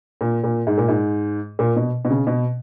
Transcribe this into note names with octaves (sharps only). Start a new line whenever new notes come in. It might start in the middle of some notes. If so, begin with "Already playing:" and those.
A#2
A#2
G#2
A#2
G#2
A#2
B2
B2
C#3
B2